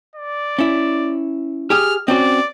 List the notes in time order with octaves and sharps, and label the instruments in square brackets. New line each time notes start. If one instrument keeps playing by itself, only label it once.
[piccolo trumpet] D5
[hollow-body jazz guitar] C#4 E4
[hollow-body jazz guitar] G4 G#4 [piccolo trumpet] F6
[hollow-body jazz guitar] C4 C#4 F#4 [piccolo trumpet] D5